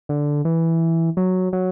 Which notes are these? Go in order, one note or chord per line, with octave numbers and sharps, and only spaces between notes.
D3
E3
F#3
F#3